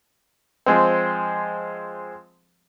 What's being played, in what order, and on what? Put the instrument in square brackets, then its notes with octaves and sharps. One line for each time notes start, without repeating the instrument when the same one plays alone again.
[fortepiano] F3 G#3 C4